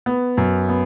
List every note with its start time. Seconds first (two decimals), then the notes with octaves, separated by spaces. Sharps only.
0.06 B3
0.37 F#2
0.69 B3